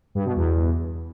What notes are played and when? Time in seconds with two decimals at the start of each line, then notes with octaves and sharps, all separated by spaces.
0.15 G2
0.25 B2
0.36 E2